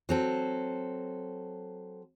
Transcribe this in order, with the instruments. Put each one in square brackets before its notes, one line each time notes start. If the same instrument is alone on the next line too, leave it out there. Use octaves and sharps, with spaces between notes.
[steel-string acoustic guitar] F#3 C4 A4